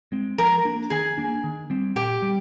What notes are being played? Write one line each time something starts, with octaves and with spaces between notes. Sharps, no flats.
G#3 C4
F3 A#4 A#5
A#3 D4
D#3 G#4 G#5
A#3 D4
D#3
G3 C4
A#2 G4 G5
G3